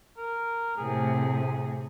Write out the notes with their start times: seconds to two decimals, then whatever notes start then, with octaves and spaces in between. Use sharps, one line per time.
0.17 A#4
0.77 A2 C3 G#4